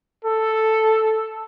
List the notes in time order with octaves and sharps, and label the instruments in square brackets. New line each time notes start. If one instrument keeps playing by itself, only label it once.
[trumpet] A4